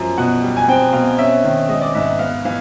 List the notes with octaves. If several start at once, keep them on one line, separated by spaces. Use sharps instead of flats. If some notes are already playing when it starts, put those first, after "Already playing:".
Already playing: F#2 F3
B2 F#5
G3
G#5
C4 G5
B2 F5
C#4 E5
D#3
G#3 D#5
D5
G#2 E5
B3 F5
E3 F5